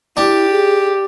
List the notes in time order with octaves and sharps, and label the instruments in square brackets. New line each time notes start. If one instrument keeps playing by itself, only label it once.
[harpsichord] D4 [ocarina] E4 [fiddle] G4
[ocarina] G#4